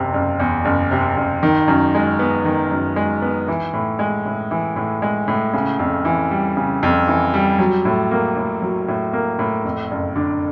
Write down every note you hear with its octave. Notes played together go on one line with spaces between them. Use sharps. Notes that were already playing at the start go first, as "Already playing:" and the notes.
Already playing: F#1 E2 C3
F#1
E2
F#1
C3
F#1
D#3
F#2
G#3
B3
D#3
F#2
G#3
B3
E3
A2
G#3
A2
E3
A2
G#3
A2
C#3
F2
E3
G3
C#3
F2
E3
G3
F#3
A2
A#3
A2
F#3
A2
A#3
A2
F2
F#1
D3